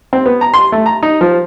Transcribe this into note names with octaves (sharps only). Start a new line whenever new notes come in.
C4
B3
A#5
C6
A3
A#5
D#4
F3